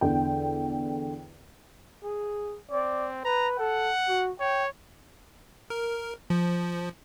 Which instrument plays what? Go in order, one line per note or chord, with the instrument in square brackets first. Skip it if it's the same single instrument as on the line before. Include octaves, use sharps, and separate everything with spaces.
[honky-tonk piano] E2 D3 G5
[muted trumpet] G#4
[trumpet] C4 [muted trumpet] D5
[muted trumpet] B4 [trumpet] A#5
[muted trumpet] A4 [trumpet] F#5
[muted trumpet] F#4
[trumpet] C#5 [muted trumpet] G5
[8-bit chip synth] A#4
F3